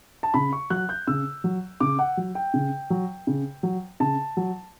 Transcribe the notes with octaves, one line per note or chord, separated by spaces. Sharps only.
A5
C#3 B5
C#6
F#3 F#6
G6
C#3 E6
F#3
C#3 D6
F#5
F#3
G5
C#3
F#3
C#3
F#3
C#3 A5
F#3